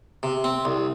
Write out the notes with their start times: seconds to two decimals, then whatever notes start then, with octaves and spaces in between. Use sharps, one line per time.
0.23 C3
0.44 C4
0.65 C2